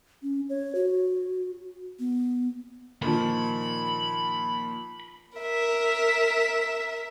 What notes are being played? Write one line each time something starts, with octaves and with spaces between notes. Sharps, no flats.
C#4
C#5
F#4
B3
A#2 D#3 F3 B5
A#4 E5